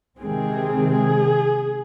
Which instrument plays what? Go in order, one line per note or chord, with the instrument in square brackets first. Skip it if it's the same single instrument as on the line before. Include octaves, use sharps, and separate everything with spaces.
[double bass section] C3 D#3 G#3 C4 [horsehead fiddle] G#4
[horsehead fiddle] G#4